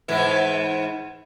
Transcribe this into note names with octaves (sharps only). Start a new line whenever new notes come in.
G#2 E3 E4